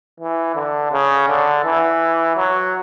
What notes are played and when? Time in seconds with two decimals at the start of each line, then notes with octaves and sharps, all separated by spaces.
0.20 E3
0.55 D3
0.92 C#3
1.28 D3
1.64 E3
2.37 F#3